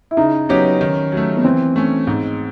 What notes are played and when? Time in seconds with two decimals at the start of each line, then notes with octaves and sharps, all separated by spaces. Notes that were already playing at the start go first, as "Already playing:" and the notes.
0.11 E4
0.17 C#3 D#4
0.49 F#3 B3 C#4 D#4 G4
0.81 D#3
1.12 F#3 A3
1.37 B3
1.44 E3 C4
1.76 A3 C#4
2.07 G#2